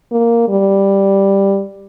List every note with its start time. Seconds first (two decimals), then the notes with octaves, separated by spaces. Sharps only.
0.12 A#3
0.49 G3